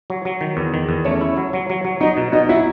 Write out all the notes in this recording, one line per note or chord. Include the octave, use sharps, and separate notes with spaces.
F#3
F#3
D#3
E2
D#3
E2
A3 C#4 C#5
E4
F#3
F#3
F#3
F#3
F#3 D#4 D#5
B2
B2 D#4 D#5
F#3 E4 E5